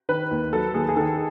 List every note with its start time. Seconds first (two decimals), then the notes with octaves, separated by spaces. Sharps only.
0.09 D#3 B4
0.31 D#2
0.53 F#3 A4
0.74 D#2 G#4
0.88 G#4
0.96 D#3 A4